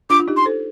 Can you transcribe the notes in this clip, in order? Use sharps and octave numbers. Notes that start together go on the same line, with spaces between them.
D4 F4 D6
F4
D#4 G4
C6
A4 C5